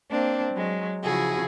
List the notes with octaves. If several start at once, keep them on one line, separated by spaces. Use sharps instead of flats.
A#3 C4 D4
F#3 G#3
C#3 F3 E4 F#4 G#4